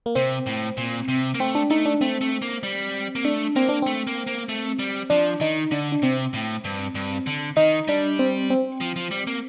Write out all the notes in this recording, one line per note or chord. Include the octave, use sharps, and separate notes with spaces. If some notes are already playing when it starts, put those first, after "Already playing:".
A#3
C3 C4
A2
A#2
C3
A#3
A3 C4
D4
A3 D#4
D4
A3 C4
A3
A#3
G3
A#3
A3 D4
A#3 C4
D4
A3 C4
A#3
A#3
A3
G3
F3 D4
D#3 D#4
D3 D4
D4
C3 C4
A2
G2
G2
D3
D#3 D#4
G3 D4
C4
C4
F3
F3
G3
A#3